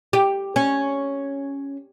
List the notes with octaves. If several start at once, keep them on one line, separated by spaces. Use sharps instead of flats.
G4
C#4